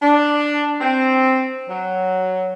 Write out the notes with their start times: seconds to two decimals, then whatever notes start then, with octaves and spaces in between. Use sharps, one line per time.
0.02 D4
0.81 C4
1.68 F#3